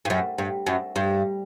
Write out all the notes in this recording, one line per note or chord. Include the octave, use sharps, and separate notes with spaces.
G2
F#2
G2
F#2
G2